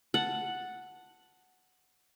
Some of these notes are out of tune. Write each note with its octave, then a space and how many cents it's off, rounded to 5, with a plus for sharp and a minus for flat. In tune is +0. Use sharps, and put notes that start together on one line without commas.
F#5 +0 A5 +0